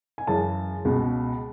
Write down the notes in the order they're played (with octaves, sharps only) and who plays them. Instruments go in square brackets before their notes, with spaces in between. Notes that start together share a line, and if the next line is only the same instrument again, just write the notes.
[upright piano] G#5
F#2 C#3 E3 G#3 A5
C#2 B2 G#3